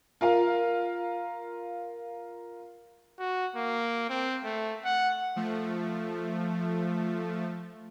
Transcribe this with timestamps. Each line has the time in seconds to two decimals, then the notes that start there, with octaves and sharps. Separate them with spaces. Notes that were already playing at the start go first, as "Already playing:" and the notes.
0.21 F4 A#4 F5
3.19 F#4
3.56 A#3
4.09 C4
4.44 A3
4.85 F#5
5.36 F3 A3